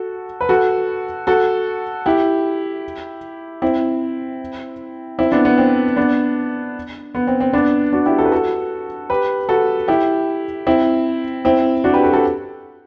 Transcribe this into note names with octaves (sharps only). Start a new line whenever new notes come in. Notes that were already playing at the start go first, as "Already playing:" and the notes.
Already playing: F#4 A4
B4
F#4 A4
F#4 A4
E4 G4
C4 E4
C4 E4
B3 D4
B3
C4
B3 D4
B3
C4
C4
B3 D4
D4 F#4
E4 G4
F#4 A4
B4
F#4 A4
G4 B4
F#4 A4
E4 G4
C4 E4
C4 E4
D4 F#4
G4 B4
F#4 A4
F#4 A4